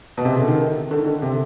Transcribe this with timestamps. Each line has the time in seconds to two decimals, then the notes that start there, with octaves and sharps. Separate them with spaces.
0.17 B2
0.25 C3
0.33 C#3
0.40 D3
0.48 D#3
0.91 D3
0.99 D#3
1.06 D3
1.22 C3